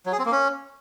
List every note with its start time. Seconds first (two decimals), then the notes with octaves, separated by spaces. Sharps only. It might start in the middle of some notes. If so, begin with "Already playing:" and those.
0.06 F#3
0.12 G#4
0.19 C4
0.25 A#3
0.32 C#4